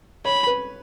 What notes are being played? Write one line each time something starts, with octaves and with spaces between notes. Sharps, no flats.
C#5 B5
B4